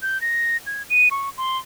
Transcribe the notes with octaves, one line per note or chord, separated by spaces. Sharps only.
G6
A#6
G#6
D#7
C#6
C6